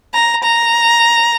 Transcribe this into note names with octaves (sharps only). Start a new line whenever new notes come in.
A#5
A#5